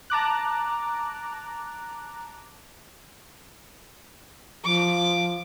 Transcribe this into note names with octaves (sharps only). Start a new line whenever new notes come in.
A5 A#5 D6 F#6
F3 D6